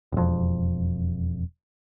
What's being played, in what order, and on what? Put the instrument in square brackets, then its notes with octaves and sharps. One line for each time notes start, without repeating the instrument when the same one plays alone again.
[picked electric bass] E1 F2